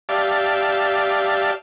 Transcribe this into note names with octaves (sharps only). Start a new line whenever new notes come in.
G4 D5 E5 F5 A5